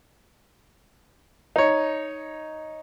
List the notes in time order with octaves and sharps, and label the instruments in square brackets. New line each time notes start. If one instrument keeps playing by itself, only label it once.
[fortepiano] D#4 C#5